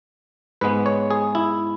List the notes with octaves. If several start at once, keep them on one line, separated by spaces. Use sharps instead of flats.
G#2 G#3 B3 B4
C#5
G#4
E4